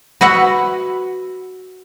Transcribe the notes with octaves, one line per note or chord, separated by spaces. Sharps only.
F#4 B4 E5 F#5